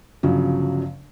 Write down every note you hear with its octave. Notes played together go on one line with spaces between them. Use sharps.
G1 C#3 F3 F#3